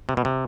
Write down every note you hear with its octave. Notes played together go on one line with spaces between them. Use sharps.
C3
B2
C3